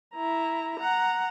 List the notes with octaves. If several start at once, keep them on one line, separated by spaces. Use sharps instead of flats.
E4 A#5
F#5 A#5